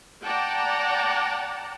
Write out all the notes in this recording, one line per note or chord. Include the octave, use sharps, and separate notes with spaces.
D5 F#5 G5 A5 A#5